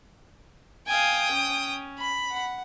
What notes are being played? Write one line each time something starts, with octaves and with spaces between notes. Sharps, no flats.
F5 G5 G#5 D#6
C#4
B5
F#5